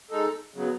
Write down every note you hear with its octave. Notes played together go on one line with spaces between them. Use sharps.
G#3 D#4 A4
C#3 F#3 B3